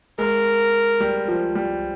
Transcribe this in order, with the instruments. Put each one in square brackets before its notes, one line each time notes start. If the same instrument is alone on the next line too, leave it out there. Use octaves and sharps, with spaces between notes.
[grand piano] G#3 [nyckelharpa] A#4
[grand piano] G3
F3
G3